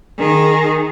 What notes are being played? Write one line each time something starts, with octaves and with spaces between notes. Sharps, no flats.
D#3 G#4